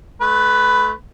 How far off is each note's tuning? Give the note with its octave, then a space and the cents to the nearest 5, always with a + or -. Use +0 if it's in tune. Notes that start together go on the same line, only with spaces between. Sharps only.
A3 -35 B4 +10